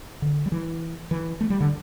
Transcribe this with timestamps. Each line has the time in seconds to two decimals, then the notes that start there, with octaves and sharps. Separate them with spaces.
0.22 D3
0.46 G3
0.52 E3
1.11 E3
1.41 A3
1.50 G3
1.60 D3